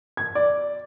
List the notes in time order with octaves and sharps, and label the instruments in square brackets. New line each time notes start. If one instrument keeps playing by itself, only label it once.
[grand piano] G#6
D5